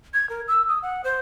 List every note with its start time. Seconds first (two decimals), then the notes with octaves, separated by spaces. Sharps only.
0.14 G#6
0.29 A#4
0.48 E6
0.68 D#6
0.82 F#5
1.04 C5